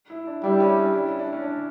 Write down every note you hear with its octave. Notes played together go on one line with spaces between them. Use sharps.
E4
D4
G3 E4
C#4
D4
E4
D4
C#4
D4